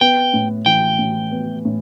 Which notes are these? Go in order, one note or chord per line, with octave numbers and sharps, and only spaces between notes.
B3 G5
A2
E3 G5
A2
B3
A2